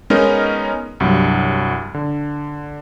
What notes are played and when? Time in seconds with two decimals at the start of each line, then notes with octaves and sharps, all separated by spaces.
0.10 G#3 B3 C#4 D#4 A#4 D#5
1.00 C2 G2 F#3
1.94 D3